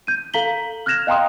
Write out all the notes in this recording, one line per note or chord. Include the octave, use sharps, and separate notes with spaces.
G6 D#7
A4 F5 A#5 B6 F#7 G7
F6 F#6 G#6 A#6 E7 F7
D#5 F5 G5 A#5 C6 D#6